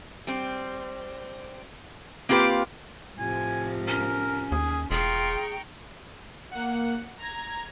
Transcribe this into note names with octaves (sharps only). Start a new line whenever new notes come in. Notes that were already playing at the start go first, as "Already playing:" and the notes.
G3 C4
A#3 C4 F4 G4 B4
A2 C3 F3 G#5
C#4 A#4
D#2 G#4
E1 F4 G#4 G5 A#5 C#6
A#3 F#5
A#5 G#6